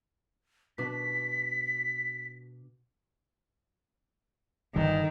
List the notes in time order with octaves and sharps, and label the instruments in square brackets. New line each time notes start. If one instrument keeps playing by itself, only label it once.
[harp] B2 D4 [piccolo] B6
[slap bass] G1 D3 G3 [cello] D#3